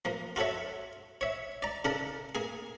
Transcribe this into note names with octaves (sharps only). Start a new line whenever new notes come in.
F3 A#3
F4 F#4 A4 C#5 E5
C#5 E5
D5 A#5
C#3 D4 A4 A#4
A#3 G#4